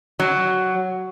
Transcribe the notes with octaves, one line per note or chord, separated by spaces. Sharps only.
F#3